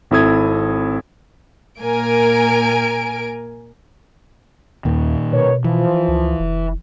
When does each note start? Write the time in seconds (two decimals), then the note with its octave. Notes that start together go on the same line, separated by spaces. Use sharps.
0.11 G#1 C4 E4 A4 D#6 G#6
1.80 A#2 A#3 A#4 G#5 D7
4.85 D#2 A#2 D#3
5.33 B2 A#4 B4 C#5
5.64 E3 F3
6.08 C#2
6.40 F1